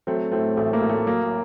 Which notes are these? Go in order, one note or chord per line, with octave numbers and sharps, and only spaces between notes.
F#3 A3 C4
A2 A3 C4
A1 A3
A#3
A1
A3
F#3 A#3